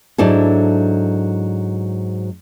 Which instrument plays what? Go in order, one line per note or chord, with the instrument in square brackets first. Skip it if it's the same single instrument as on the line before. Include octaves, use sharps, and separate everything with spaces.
[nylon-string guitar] G#2 F#3 D4 E4 A4